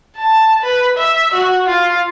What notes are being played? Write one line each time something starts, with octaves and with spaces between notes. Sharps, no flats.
A5
B4
E5
F#4
F4